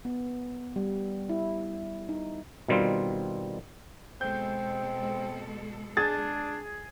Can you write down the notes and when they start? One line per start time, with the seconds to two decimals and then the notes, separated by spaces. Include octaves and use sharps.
0.05 B3
0.76 G3
1.29 E4
2.09 D#4
2.68 B2 D#3 G3 C4 F4
4.21 B2 G#3 C4 A4 G6
5.97 D4 G#4 A6